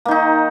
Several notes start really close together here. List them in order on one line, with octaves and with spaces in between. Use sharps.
A#3 D#3 D#4